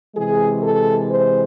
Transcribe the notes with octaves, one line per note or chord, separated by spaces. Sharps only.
C3 E3 G#3 G#4
A4
C5